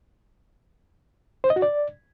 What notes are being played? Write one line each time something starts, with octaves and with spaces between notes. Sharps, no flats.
C5
D#5
F#4
D5